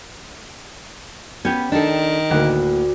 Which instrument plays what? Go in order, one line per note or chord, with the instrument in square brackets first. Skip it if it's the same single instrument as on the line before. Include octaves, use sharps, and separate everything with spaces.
[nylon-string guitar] B3 C#4 [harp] G4 G#6
[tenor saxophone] D#3 [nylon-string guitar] D4 A4
[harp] D2 F#5 [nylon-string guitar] A2 A#3